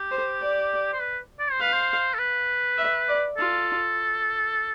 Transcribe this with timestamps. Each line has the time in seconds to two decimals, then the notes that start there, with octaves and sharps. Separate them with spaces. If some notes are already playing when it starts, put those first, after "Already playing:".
Already playing: G4
0.11 C5
0.41 D5
0.93 C5
1.00 B4
1.39 D5
1.51 C5
1.59 B4 F5
1.73 C5
2.14 A4
2.19 B4
2.78 E5
3.08 D5
3.37 F4 A4